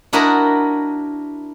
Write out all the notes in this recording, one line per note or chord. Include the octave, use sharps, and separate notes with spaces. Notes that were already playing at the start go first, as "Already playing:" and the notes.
D4 E4 F#4 A#4 D#5